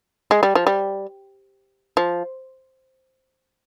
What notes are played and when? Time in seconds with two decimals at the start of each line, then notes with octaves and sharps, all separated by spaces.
0.31 G#3
0.43 G3
0.55 F3
0.67 G3
1.97 F3